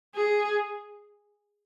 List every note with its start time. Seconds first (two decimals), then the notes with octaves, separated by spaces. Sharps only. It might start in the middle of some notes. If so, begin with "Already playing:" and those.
0.15 G#4